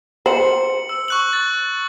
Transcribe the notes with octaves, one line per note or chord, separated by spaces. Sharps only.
C5 C#7 F#7
E6
C#6 F#6 F#7
A6